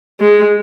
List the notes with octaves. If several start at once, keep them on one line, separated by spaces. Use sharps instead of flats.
G#3